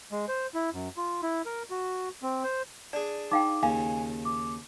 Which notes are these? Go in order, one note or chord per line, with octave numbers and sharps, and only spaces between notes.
G#3
C5
E4
F#2
F4
E4
A#4
F#4
C4
C5
D4 G#4 D5
D#4 F5 G5 D6
D#2 C#3 F5 G#5
D6